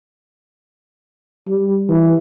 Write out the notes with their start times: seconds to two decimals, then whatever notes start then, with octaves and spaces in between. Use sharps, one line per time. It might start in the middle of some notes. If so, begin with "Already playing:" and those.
1.48 G3
1.89 E3